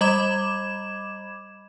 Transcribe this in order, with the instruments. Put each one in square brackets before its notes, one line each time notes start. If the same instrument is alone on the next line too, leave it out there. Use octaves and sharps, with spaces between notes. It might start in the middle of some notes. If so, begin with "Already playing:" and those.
[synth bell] G3 D#5 B5 D6 G#6 E7